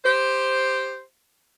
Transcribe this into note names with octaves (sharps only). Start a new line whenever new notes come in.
G4 C5